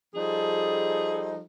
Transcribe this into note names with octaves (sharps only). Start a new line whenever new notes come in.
F3 G3 D#4 G#4 A4